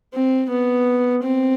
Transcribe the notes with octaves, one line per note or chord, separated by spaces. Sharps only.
C4
B3
C4